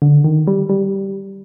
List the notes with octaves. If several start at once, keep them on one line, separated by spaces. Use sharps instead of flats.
D3
D#3
G3
G3